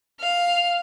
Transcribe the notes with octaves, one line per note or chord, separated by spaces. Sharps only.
F5